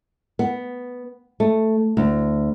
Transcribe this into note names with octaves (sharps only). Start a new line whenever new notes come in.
B3
A3
D2